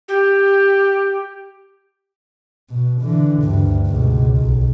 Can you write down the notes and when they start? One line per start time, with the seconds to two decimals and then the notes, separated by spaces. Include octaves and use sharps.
0.08 G4
2.70 B2
3.02 D3 E3
3.44 D2 G2
3.86 C#2 B2
4.37 B1